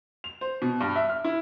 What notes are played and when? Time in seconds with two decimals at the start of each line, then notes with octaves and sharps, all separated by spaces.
0.24 F7
0.41 C5
0.62 B2
0.81 G2
0.96 E5
1.09 F6
1.24 E4